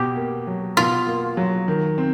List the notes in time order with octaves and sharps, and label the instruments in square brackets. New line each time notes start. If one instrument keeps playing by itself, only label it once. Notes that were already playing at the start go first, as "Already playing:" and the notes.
Already playing: [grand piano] B2 [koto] G4
[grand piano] A#3
F#3
[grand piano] B2 [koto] F4
[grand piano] A#3
F#3
D#3
C4